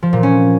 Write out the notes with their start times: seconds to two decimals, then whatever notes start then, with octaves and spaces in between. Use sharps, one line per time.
0.03 F3
0.13 A#2
0.23 C#4